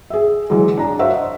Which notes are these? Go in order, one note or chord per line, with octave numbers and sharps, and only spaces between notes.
G#4 E5
E3 F#3 G#3
D4 A#5
F#4 C5 C#5 E5 F5
D#5